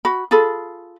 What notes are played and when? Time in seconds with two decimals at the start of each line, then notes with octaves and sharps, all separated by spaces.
0.05 F#4 B5
0.31 F4 G#4 A4 B5